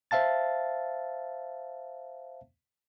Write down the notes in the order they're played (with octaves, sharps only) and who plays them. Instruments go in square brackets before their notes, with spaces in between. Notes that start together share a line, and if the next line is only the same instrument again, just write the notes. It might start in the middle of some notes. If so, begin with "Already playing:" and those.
[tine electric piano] C5 E5 F5 A5 A6